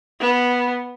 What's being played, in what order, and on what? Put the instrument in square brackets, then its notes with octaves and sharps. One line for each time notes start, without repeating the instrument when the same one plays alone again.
[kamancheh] B3